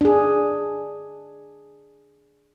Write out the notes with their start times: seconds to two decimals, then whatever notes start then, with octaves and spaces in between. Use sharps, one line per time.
0.01 D4 G#4